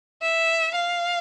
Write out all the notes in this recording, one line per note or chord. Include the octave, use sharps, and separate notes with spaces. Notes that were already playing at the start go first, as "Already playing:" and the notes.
E5
F5